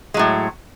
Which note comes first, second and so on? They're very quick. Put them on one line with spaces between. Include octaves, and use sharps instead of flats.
G#3 F#3 A2